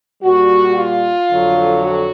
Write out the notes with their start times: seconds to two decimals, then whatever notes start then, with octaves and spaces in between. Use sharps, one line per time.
0.22 A#2 G3 F#4
0.76 F4
1.30 F2 D3 F#3
1.83 F#4